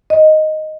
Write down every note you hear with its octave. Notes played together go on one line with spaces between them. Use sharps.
D#5